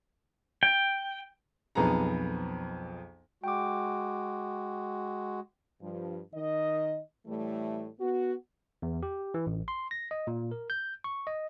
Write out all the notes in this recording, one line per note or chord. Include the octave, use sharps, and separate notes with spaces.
G5
B1 F2 B3 G#4 A#5
G#3 F#4 G5 D6
G2 F3
D#3 D#5
A2 E3 G3 A3
B3 F#4
E2
G4
E3
A1
C6
A#6
D#5
A#2
A#4
G6
C#6
D#5